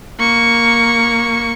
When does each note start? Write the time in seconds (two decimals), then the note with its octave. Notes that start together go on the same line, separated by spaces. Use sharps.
0.19 A#3 C#6